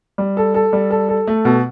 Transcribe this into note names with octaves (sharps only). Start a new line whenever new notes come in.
G3
A4
A4
G3
A4
A4
A3
B2